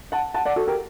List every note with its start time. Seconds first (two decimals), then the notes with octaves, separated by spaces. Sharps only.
0.12 F#5 A5
0.34 F#5 A5
0.46 D5 F#5
0.56 F#4 A4
0.67 G4 A#4